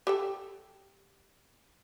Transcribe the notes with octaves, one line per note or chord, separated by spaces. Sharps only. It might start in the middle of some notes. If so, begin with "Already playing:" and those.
G4 A4 G5